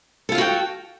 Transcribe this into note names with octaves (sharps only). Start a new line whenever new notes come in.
F4 F#4 A4 F5 G5